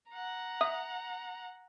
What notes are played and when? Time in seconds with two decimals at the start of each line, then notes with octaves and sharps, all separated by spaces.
0.11 F#5 A#5
0.61 E5 D#6